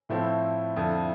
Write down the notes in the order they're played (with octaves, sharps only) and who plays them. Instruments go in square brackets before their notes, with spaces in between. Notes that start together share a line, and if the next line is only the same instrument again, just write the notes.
[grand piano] A2 F3 A3 C4 [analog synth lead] E4
[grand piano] F2 D3 F3